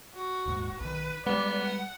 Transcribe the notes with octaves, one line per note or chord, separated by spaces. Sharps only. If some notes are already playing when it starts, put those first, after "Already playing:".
F#4
D#1 G#2
B1 D#3 B4
G3 G#3 B3 D5
F#5